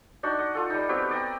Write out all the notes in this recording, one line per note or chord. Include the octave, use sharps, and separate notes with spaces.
D4 D#4 F#4
D#5 F#5
F4 A4
G3 D#4
B3 C4 F#4 G4
D5 D#5 G5 A#5